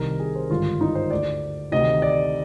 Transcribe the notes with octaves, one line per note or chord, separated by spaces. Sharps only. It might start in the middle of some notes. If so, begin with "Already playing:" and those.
Already playing: C2 C3 D#3 A#4
G#4
C5
G#1 G2 D3 F4
D#4
C5
D2 D3 D5
D2 C3 D#3 D#5
D5